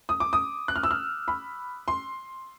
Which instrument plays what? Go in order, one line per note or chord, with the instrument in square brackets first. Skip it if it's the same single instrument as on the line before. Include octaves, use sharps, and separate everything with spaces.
[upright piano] D#6
D6
D#6
F#6
F6
E6
F6
B5
C6